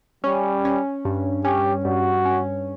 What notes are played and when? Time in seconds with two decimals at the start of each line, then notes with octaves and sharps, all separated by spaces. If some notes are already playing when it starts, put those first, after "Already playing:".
0.24 G3 C#4
0.65 C#4
1.05 G2
1.45 C#4 G4
1.85 G2 F#4
2.25 C#4